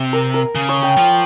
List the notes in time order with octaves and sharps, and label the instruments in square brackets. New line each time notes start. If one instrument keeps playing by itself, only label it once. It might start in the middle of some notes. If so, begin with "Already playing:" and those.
Already playing: [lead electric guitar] C3
[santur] A#4
A#4
[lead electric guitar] C#3
[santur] C#5
G5
[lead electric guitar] F3